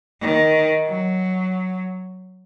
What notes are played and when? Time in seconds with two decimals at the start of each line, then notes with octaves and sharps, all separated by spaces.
0.21 D#3
0.87 F#3